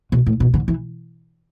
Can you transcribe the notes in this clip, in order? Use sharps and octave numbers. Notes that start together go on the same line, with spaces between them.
B2
A2
B2
D3
E3